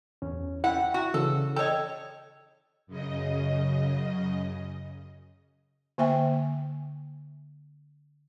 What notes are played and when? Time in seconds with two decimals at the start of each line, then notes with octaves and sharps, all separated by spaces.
0.22 E2 C#4
0.64 E4 E5 F#5 G5
0.94 F#4
1.14 C#3 E3 A4
1.56 A4 C#5 D#5 G5
2.87 F#2 C#3 D#5
5.98 D3 A#3 E5 G5 G#5